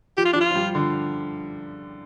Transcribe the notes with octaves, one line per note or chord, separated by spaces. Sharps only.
F3 G4
F4
F3 D4
F4
F3
G3
D3